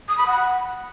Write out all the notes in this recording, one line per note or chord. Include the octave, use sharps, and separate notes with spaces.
D#6
B5
F#5